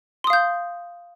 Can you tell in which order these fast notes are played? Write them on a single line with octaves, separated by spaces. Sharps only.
C6 D#6 F5 G6